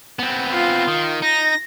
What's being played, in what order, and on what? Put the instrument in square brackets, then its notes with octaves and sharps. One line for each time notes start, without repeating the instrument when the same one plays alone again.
[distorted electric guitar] B3 C4
[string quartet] F4
[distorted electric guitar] D#3
[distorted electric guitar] D#4 [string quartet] A#6